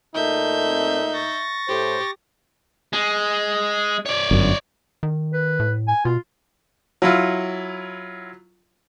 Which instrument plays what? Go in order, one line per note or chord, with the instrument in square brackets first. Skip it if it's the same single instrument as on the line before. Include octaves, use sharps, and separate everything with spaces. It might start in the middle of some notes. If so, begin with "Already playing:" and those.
[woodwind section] A#2 A3 [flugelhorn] D#4 [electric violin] E5 G6
[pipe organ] C4
C#6 A6 A#6
[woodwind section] A2 [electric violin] G4 [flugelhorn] C5
[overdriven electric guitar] G#3
C#5 D5
[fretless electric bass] G1 F#2
[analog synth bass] D#3
[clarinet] B4
[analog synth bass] A2
[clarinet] G#5
[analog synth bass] B2 [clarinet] F4
[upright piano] F#3 E4 F4